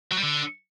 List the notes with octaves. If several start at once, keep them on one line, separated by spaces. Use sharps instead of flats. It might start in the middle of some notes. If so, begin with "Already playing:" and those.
F#3
G3
D3